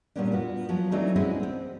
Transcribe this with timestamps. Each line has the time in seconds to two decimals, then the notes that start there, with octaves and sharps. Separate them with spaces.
0.16 A#2 C#3 G3 B3 C#4 D4
0.32 B3 F4 F#4
0.69 F3 F#3 B3
0.91 E3 F#3 A3 C4 D4 D#4
1.16 G#3 C4 C#4 E4 F#4 G#4
1.40 B3 C4